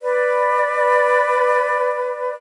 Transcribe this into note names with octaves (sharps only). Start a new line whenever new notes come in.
B4 D5